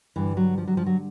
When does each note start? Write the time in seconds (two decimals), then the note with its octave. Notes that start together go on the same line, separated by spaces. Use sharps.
0.16 G2 D3 E3
0.37 F#3
0.58 F3
0.67 F#3
0.77 F3
0.86 F#3